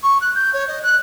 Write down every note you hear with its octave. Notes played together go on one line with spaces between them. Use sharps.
C#6
F#6
G6
C#5
D#5
F#6